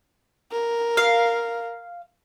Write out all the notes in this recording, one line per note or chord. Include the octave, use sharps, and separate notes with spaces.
A#4
F5